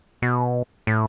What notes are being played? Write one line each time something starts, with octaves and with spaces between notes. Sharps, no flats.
B2
A2